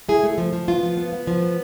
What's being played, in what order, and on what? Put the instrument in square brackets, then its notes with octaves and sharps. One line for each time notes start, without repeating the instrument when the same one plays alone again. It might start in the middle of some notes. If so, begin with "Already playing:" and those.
[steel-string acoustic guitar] E4 G#4
A3
F3
F3
B3 F4
F3
B3
B3
F3
B3